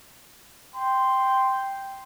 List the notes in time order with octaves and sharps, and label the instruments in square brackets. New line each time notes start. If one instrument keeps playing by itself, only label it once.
[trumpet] G5 [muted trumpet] C6